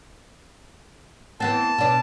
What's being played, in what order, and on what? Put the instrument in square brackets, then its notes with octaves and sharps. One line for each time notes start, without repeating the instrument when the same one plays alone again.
[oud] E3 B3 C4 [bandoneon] A5
[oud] B2 D4